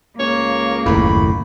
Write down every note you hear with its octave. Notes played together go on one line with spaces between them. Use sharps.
C#2 A#3 C#5
F#1 D#2 A2 B5